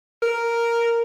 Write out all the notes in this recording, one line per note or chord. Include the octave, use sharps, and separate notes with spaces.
A#4